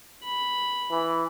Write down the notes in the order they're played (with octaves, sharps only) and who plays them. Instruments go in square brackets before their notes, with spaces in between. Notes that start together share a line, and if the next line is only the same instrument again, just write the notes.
[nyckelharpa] B5
[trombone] E3